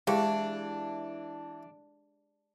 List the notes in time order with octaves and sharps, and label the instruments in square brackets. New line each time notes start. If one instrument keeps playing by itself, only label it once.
[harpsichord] E3 [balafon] G#3 [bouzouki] D4 [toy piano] G4 G#4 F5